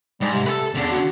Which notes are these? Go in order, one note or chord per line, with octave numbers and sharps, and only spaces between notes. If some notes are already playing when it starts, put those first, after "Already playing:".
G#2 G3
C3
A4 B4
E2 C#3 D4
F#4